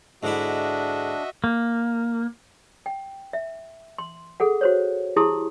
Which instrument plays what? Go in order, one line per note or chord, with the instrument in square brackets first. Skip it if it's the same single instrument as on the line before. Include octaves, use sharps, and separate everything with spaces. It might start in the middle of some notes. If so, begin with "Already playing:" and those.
[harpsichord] G#2 D3 E4 [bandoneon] D4 [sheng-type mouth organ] F#4 D#5 E5
[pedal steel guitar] A#3
[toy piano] G5
E5
C6
G#4 A4 F#5
F#4 C5 C#5
E4 G4 G#4 A5 C6 D#6